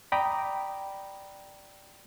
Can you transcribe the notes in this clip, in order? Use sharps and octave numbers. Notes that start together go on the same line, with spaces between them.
D5 G5 A#5 B5 D6 D#6